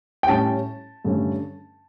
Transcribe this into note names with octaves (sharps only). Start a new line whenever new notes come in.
G5
A2 G3 C#4 A5
G2 D3 A3 C#4